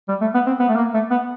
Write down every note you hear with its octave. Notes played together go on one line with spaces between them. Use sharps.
G3
A3
B3
C4
B3
A3
A#3
A3
B3